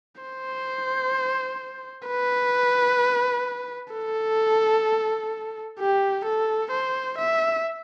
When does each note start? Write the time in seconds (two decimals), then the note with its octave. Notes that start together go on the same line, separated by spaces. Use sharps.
0.22 C5
2.07 B4
3.93 A4
5.80 G4
6.25 A4
6.72 C5
7.19 E5